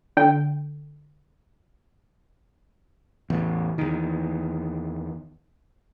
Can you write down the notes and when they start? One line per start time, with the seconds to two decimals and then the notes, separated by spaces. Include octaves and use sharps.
0.17 D3 G5
3.30 A1 E2
3.78 E2 D#3